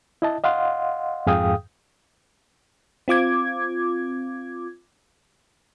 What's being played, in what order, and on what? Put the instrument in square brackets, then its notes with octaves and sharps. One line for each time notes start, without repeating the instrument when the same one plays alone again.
[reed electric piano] E4 D#5 A5
D#5 F5 F#5 C6
F2 G#2 G#4 F5 G5 D#6
[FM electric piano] C4 F4 D6 G#6